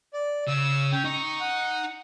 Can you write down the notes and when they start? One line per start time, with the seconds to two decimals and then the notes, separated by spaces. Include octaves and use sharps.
0.14 D5
0.48 C#3 E6
0.92 C#4 G5
1.05 D#4 C#6
1.40 F#5